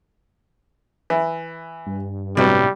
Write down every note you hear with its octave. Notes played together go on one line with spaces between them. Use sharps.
E3
G2
A2 C3 F#3 G3 B3